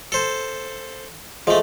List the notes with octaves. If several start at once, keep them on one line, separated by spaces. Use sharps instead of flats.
A4 C5
F3 G#3 A3